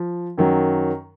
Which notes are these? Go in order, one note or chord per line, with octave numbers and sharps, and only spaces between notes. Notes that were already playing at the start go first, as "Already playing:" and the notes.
Already playing: F3
F#2 D#3 F#3